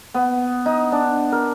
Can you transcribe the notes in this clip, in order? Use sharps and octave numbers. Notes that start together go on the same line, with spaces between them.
B3
D#4
D4
A#4